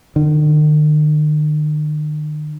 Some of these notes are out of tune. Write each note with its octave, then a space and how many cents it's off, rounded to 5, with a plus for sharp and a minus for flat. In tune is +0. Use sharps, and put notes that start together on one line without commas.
D#3 -45